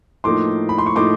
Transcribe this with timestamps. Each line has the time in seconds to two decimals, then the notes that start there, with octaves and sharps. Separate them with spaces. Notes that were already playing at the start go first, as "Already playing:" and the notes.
0.24 A2 F3 A#3 D#4 C6 D6
0.69 B5
0.78 C6
0.86 C#6
0.96 A2 F3 A#3 D#4 C6 D6